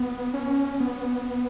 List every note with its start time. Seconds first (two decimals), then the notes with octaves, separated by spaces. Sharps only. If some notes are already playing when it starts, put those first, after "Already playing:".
Already playing: B3
0.34 C#4
0.80 B3